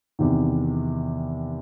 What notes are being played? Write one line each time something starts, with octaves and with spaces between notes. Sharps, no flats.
E2 C3 D#3